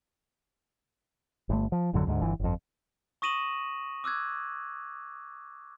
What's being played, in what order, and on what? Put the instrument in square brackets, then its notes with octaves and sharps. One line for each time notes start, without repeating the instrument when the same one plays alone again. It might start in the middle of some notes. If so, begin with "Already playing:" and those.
[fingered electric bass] G1 A3
F3
G#1 F2 D3 F#3
D2 G#2 B2 D3
G1 E3
G1 F2
[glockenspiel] C#6 D#6 A#6 D#7 E7 F#7
D6 E6 F#6 G#6